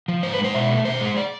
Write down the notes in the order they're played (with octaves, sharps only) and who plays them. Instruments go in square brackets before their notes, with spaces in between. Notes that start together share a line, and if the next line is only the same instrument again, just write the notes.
[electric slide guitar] F3
G#2 C5
B4
G#3
C5
B2 E5
A3
B2 C5
G#3
D5